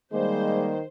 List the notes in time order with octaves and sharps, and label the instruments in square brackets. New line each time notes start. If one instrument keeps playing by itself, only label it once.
[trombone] D#3 [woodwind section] G3 A#3 [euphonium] G#3 [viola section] C5